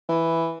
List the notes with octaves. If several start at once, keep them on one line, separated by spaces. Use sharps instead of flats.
E3